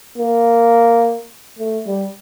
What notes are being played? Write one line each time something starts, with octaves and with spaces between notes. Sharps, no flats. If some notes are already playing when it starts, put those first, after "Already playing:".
A#3
A3
G3